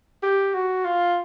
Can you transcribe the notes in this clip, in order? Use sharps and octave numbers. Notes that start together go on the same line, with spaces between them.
G4
F#4
F4